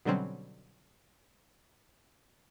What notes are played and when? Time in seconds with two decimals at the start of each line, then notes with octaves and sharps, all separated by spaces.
0.05 B2 D3 F#3 G3 C4 C#4